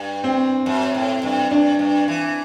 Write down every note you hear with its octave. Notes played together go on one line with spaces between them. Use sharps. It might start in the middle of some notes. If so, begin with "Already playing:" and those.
Already playing: G2
C4
F#2
A2
G2
G2 D4
G2
E3